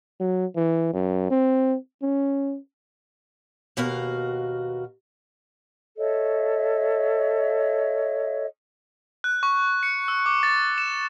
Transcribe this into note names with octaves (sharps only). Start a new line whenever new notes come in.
F#3
E3
F#2
C4
C#4
D#2 B2 F#4 A#4 F5
A4 C#5 D#5 E5
F#6
C#6
C#7
E6
D6
A6
E7